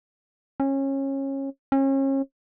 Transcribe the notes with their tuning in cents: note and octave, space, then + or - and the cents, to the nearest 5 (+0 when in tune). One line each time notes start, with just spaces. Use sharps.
C#4 -25
C#4 -35